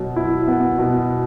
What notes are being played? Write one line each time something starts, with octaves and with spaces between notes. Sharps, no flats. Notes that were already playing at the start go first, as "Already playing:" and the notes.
Already playing: B2 F#3
E4
B3
B2